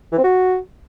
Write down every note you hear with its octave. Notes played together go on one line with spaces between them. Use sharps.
E3
C4
F#4